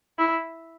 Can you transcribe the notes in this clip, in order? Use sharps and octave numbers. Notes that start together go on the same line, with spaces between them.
E4